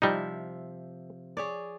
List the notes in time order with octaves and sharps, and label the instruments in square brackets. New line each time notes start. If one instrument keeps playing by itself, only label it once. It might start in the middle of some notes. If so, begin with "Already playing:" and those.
[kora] C3 F3 E5 [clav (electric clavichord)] G3 D#4
[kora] G#4 C#5 D5